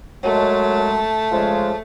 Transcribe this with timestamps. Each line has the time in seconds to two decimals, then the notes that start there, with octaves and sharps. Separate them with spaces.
0.23 F#2 F#3 G#3 A3 A5
1.32 C#3 F3 G#3